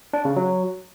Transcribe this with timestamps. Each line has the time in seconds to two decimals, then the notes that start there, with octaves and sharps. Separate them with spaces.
0.13 D4
0.25 C#3
0.36 F#3